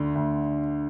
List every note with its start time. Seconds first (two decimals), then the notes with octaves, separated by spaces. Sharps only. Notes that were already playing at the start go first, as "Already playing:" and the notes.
Already playing: D2 D3
0.15 D2